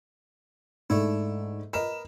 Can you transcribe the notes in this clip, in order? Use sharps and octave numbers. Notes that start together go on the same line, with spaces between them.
G#2 A3 D4 E4
A#4 B4 D#5 E7